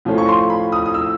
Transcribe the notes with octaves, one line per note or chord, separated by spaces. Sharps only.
A2 F3 A3 C#4 F4
C#6
C6
B5
D#6
D#6
E6